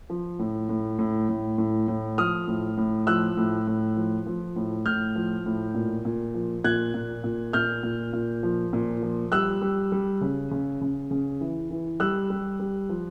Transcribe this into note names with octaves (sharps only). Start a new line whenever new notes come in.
F3
A2
A2
A2
A2
A2
A2
F3 D#6 F6
A2
A2
F3 E6 F#6
A2
A2
F3
F3
A2
A2 F6 G6
F3
A2
A#2
A#2
F3
A#2 F#6 G#6
A#2
A#2
A#2 F6 G6
A#2
A#2
F3
A#2
F3
G3 E6 F#6
G3
G3
C#3
C#3
C#3
C#3
E3
E3
G3 E6 F#6
G3
G3
F3